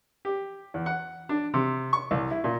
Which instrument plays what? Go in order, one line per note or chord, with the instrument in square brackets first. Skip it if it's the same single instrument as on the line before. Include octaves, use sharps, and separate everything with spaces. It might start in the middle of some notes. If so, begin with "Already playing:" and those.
[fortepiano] G4
E2
F#5
D4
C3
C#6
C2
E4
A#2